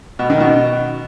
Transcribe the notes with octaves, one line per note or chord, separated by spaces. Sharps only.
B2
D#3
B2